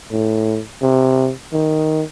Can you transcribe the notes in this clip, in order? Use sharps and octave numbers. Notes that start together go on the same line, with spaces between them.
A2
C3
D#3